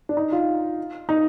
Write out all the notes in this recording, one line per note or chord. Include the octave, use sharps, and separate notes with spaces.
D4
D#4
F4
D#4